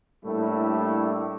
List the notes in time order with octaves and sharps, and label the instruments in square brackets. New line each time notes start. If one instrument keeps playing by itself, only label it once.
[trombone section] A2 G3 A3 A#3 D4 E4